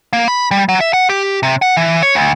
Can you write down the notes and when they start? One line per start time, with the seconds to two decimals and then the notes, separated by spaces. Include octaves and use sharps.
0.13 A#3
0.28 B5
0.51 G3
0.69 F#3
0.80 E5
0.93 F#5
1.09 G4
1.43 C3
1.62 F#5
1.77 E3
2.03 C#5
2.15 D2